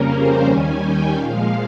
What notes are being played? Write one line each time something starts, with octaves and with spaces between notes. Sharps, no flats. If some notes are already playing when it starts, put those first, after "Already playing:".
Already playing: F2 C#3 G3 A#3 C#4 A#4
C5
D#2 D#3 G3 C#4 G#5
G5
A#2 F3 G#3 F5